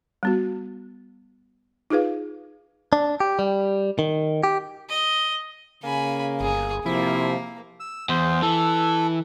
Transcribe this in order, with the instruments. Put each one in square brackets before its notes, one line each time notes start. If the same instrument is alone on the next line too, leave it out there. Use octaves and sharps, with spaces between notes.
[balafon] G3 B3 F#4
D#4 F4 G#4 B4 F5
[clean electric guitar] D4
G4
G3
D#3
G4
[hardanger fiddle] D#5
[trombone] C#3 [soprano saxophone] A#3 [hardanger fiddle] G#5 B5
[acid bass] G1 [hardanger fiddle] G#4
[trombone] C3 [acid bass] F3 [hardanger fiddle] A#3 [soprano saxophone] E4
[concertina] E6
[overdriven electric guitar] E2 [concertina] C5
[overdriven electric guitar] E3 [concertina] A4